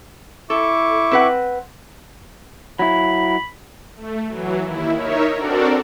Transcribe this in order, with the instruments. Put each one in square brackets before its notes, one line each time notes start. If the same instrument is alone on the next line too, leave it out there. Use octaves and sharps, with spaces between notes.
[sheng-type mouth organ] E4 C#6 D6 [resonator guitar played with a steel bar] A4
[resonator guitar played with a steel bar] C4 B4 F#5
[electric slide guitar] F#3 E4 [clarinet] B5
[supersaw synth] A3
E3 F#3
D#2 E4
D#4 A#4 C#5 E5
C4 D4 F#4 A4 A#4 D5